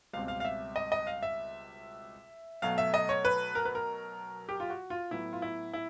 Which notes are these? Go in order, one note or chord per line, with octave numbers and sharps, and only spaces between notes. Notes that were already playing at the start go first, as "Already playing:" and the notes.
C#2 B2 G3 C4 F5
F5
F5
E5
D#5
D#5
F5
E5
B2 F#3 A3 F5
E5
D#5
C#5
B4
A#4
B4
A#4
G4
F4
F#4
F4
A2 F#3 B3 E4
F4
E4
E4